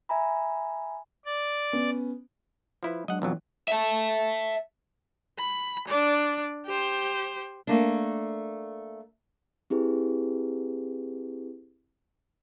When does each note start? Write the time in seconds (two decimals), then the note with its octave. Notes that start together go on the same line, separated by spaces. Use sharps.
0.09 E5 G#5 A#5 B5
1.26 D5
1.73 B3 C#4
2.83 F3 E4 B4
3.08 F#3 G#3 D4 D#5 F#5
3.22 B1 F2 E3 F#3
3.68 E5 A5
5.39 B5
5.88 D4 D5
6.66 G4 C5
7.67 A3 A#3 D4
9.70 C4 E4 G4 G#4 B4